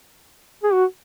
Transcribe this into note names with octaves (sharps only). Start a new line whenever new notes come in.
G#4
F#4